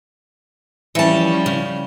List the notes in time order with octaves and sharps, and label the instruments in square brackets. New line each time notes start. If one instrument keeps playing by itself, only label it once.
[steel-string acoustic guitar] E3 A5 [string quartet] F3 G3 C#4
[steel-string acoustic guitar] C#3